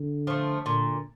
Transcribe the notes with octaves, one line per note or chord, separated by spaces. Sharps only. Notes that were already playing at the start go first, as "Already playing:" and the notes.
Already playing: D3
F3 A3
A#2 D3